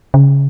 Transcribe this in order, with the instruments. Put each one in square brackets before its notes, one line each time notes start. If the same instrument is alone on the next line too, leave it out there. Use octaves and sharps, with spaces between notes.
[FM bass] C#3